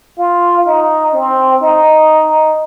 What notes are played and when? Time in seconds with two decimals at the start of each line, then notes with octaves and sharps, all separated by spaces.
0.18 F4
0.66 D#4
1.13 C4
1.61 D#4